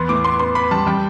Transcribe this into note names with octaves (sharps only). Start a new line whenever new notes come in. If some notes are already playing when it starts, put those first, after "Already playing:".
Already playing: E2 B3 C6
A2 D6
B3 C6
B3 C6
B3 B5
G3 A5
G3 G5